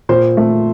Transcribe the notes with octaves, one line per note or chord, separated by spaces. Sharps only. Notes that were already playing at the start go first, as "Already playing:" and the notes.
A#2 C5
A3